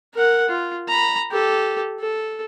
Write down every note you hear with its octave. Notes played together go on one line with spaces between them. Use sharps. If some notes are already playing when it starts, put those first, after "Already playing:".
A#4 F#5
F4
A#5 B5
G4 A4
A4